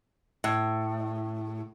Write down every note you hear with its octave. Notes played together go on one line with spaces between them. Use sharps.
A2